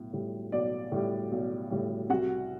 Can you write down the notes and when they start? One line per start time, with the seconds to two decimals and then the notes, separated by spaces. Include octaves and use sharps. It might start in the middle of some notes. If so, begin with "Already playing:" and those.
Already playing: B1 A2
0.13 A2 G3
0.52 B1 D5
0.92 A2 G3
1.31 B1
1.70 A2 G3
2.10 C2 F#4 F#5